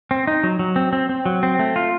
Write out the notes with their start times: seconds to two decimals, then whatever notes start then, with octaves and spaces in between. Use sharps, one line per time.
0.11 C4
0.27 D#4
0.43 F#3
0.59 F#3
0.76 C4
0.93 C4
1.09 C4
1.26 F#3
1.43 C4
1.59 A3
1.76 F4